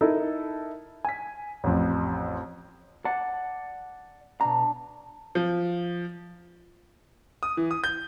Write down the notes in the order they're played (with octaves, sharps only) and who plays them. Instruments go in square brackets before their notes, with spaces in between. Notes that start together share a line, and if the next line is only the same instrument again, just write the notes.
[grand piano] D#4 E4 A4 A#4
G#5 B6
A1 F2
[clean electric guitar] D5 F#5 A5
[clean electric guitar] B2 A#5 [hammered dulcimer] D4
[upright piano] F3
[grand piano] D#6
E3
D#6
G6